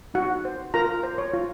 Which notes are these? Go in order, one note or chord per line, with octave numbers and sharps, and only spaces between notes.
D#4 F#4 F#5
C5
F4 A#4 A#5
C5
C#5
F4